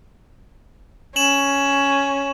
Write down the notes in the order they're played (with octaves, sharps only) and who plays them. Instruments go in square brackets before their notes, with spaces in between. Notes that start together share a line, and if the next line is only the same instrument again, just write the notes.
[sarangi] C#4 [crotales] E7 F#7